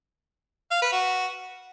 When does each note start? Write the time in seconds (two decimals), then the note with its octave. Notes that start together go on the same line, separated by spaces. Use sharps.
0.72 F5
0.82 B4
0.93 F#4